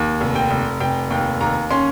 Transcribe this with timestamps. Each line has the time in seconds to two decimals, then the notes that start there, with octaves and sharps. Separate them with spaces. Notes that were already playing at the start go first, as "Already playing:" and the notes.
Already playing: D#2
0.21 F1
0.36 G5
0.51 F1
0.80 F1 G5
1.10 D#2 G5
1.41 D#2 A#5
1.71 C#4 C6